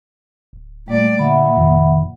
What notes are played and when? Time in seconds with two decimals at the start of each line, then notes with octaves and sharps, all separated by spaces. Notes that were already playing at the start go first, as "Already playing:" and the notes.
0.53 D1
0.88 A#2 G3 A3 D5
1.19 A#2 D3 E5 F#5 B5
1.57 F1 D#3